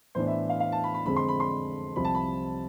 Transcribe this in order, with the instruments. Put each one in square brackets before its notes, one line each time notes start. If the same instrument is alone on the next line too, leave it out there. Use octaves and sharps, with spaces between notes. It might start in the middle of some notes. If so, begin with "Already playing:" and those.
[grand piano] A2 E3 B3 D4 C5
E5
F5
F5
A5
B5
B5
F2 D3 G#3 C4 B5
C6
B5
C6
C2 C3 F3 B5
A5
B5